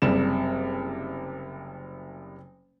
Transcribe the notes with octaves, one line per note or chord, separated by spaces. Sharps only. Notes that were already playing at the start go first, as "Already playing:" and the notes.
F#1 C3 G3 E7